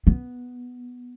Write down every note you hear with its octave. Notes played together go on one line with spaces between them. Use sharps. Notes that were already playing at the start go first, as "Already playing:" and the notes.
B3